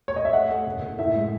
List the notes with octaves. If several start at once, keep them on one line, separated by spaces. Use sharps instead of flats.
C#5
D#5
E5
A3 F#5
A3
F#1
F#1
A2 E5
G#3